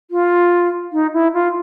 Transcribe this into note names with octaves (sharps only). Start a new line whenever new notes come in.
F4
D#4
E4
F4